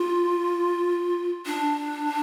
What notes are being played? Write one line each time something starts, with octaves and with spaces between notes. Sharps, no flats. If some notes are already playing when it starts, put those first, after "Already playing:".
Already playing: F4
D4